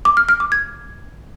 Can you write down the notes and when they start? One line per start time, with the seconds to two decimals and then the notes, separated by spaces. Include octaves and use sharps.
0.05 D6
0.17 F6
0.29 F6
0.40 D6
0.52 G#6